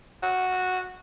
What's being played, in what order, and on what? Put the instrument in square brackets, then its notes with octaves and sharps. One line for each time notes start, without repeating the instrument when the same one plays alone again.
[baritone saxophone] F#4